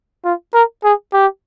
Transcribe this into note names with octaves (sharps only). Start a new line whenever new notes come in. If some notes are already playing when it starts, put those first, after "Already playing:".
F4
A#4
G#4
G4